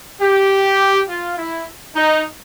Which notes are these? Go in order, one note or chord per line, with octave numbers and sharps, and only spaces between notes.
G4
F4
E4
D#4